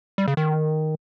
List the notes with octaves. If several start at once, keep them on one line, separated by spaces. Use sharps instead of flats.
G3
C#3
D#3